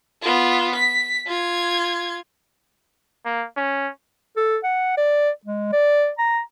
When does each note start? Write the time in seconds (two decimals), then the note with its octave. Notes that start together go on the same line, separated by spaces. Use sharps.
0.22 B3 F4
0.75 B6
1.27 F4 G#6
3.26 A#3
3.56 C#4
4.37 A4
4.64 F#5
4.97 D5
5.45 G#3
5.73 D5
6.18 A#5